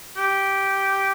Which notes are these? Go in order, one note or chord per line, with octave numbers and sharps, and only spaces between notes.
G4